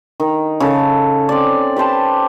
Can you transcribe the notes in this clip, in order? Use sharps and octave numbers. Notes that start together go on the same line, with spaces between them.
D#3
C#3 A4
C4 D5
G4 B4 C5 A5